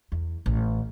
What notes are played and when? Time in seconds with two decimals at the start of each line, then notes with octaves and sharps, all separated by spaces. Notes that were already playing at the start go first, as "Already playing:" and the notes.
0.12 E2
0.46 A1